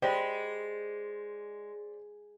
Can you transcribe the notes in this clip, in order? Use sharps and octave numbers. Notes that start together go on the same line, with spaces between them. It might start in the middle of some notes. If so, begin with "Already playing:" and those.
G#3 G4 C5 D5 D#5 B5